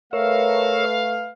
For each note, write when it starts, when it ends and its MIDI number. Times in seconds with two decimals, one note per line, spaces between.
0.13 1.30 57
0.13 0.85 70
0.13 1.30 71
0.13 0.85 73
0.13 0.85 76
0.13 1.30 77